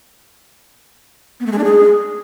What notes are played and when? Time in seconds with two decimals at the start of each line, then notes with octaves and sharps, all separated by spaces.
1.40 B3
1.46 A3
1.52 G#3
1.58 D4
1.64 G#4